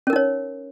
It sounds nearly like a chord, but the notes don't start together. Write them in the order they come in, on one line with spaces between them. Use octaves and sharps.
C#4 A#4 D#4 C#5